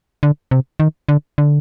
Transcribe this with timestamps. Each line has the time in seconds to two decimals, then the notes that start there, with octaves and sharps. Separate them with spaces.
0.23 D3
0.51 C3
0.80 D#3
1.09 D3
1.38 D3